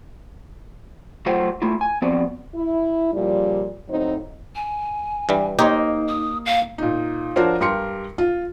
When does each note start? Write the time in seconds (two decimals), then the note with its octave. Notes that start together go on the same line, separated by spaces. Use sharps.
1.26 F#3 A3 F4 C5 F#5 G5
1.62 A3 E4 F4
1.81 G#5
2.02 F3 B3 C4 F#4 D5
2.55 E4
3.14 A#2 C#3 F3 G3
3.88 A2 F#3 C4 D#4 C5
4.55 G#5
5.29 G2 E3 G3
5.59 A#3 D#4 G4 C5 C#5
6.08 D#6
6.46 F5
6.78 A#2 D#4
7.36 F3 D4 F#4 A#4 C5 C#5
7.61 G2 G4 A#4 C6 C#7
8.18 F4